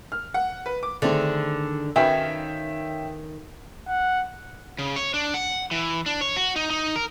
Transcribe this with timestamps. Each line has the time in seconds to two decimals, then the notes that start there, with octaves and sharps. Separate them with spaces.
0.12 F6
0.34 F#5
0.66 B4
0.83 D6
1.02 D3 D#3 A3 C4 D4 G#4
1.96 D#3 C#4 F#4 B4 C#5 E5 F5 G5
3.88 F#5
4.78 C#3
4.96 C#5
5.14 D4
5.34 F#5
5.71 E3
6.06 D4
6.21 C#5
6.37 F#4
6.56 D#4
6.70 D#4
6.96 A#4